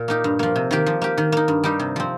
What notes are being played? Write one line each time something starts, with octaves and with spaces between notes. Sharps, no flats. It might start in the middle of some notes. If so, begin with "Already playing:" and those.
Already playing: A#2
A#3 D#4 G4
G2
F3 A#3
C3
D#3 A#3 G4
F3
A#3 G4
D#3
A#3 D#4
G2
G3 D#4 G4
C3
F3 C4